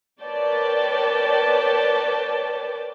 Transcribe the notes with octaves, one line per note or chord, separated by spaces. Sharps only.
A#4 B4 C#5 D5 G5 A5